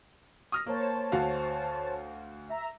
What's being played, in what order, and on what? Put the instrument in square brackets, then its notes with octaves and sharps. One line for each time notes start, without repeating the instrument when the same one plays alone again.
[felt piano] D#6 F6 A#6
[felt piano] A#3 [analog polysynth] C5 C#5 A5
[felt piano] D2 F#4 F5
[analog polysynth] E5 A#5